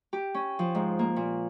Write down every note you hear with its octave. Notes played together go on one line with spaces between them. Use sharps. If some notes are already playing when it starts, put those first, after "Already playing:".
G4
C#4
F3
G#2
A#3
A#2